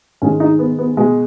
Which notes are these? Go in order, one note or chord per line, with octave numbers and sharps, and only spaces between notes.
G#2 D#3 G#3 C#4
D#4
B3
B3
B2 G#3